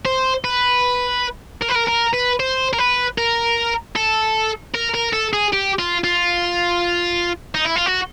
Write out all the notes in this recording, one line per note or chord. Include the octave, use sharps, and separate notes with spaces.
C5
B4
A#4
B4
A#4
A#4
B4
C5
A#4
B4
A#4
A4
A#4
A#4
A4
G#4
G4
F4
F4
D#4
E4
F4
F#4